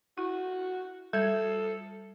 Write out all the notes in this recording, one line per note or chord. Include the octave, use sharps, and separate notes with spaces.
E4 F#4
G3 A4 G#6